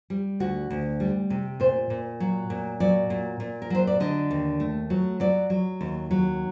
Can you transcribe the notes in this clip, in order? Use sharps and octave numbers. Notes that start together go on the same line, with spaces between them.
G3
D2 F#4
D2
G3
C3
A#2 C5
A#2
F#3
A#2
F#3 D5
A#2
A#2
A#4
F#3 C5
D5
D3 D#5
D#2
A3
F#3
F#3 D5
F#3
D#2
F#3